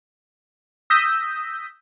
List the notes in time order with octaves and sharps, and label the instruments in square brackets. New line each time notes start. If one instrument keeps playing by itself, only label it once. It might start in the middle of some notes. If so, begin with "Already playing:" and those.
[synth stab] D#6 E6 G6 A#6 B6